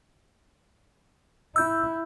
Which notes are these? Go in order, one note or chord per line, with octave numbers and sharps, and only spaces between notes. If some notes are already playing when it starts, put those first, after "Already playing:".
E4 E6 G6